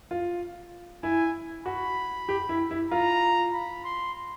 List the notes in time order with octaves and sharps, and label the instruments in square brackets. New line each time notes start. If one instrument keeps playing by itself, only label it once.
[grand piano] F4
[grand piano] E4 [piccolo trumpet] G#5
[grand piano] F#4 [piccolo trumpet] B5
[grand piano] G4
E4
E4
[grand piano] F4 [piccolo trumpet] A#5
[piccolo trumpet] B5
C6